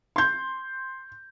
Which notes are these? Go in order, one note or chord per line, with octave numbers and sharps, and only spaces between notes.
C6 G6